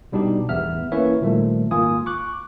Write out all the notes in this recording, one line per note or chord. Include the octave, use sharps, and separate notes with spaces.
B2 G3 D4 D#4 G4
A1 E2 B3 E5 F6
A#3 C#4 E4 B4 C#5 E5
A#2 D#3 F3 G3 A3
G#1 A#3 F4 G#5 D#6
C#6 D6 F#6